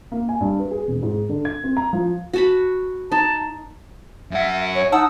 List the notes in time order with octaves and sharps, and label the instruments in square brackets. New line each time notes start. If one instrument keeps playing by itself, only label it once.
[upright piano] A#3
G#5
G2
B4
G#4
E1
G#2
D3
G#6
C4
A#5
F3
[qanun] F#4 A5 B5
[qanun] D#4 [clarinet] A5
[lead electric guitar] F#2 F#5 [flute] E5
[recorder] C#5
[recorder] D#4 [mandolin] F#5 A5 E6 [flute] D#6